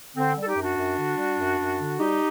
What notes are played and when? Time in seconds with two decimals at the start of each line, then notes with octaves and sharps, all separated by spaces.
0.16 D3 C4
0.36 G3
0.41 A4
0.46 D#4 G4
0.56 F#2
0.61 D4 F#4
0.76 F#2
0.97 D3
1.17 G3
1.38 F#2
1.58 F#2
1.78 D3
1.99 G3 D#4 G4